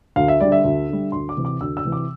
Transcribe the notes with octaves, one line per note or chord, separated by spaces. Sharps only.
D2 F5
E5
D3 G3 D5
E5
D2
D3 G3
D2 C6
D6
C3 E3
D6
D2 E6
E6
C3 E3
D6